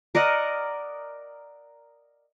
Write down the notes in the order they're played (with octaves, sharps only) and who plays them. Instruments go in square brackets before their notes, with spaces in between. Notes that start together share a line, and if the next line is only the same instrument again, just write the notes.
[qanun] A#4 D5 D#5 F#5